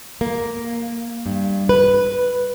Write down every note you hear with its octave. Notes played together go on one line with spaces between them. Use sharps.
A#3
G2
B4